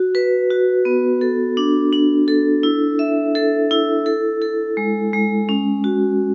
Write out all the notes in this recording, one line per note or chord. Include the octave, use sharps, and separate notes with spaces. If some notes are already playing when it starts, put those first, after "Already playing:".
Already playing: F#4
B4
F#4
B3
A4
D4
D4
A4
E4
E5
A4
E4
A4
A4
G#3
G#3
C#4
F#4